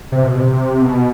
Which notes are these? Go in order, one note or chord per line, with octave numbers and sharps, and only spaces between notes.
C3
B2
C3
C3
B2